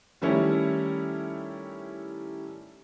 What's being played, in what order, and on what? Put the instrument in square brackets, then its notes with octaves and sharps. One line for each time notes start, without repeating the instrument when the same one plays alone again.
[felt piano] D#3 G3 A3 C#4 E4 C#5